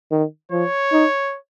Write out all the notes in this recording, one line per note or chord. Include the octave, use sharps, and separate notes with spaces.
D#3
F3 C#5
D#4